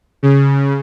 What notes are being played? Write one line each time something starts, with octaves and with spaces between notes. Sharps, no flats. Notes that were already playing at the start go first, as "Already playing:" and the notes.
C#3